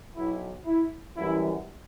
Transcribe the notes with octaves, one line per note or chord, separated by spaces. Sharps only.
B1 B2 F#3 E4
E4
F#2 E3 G3 E4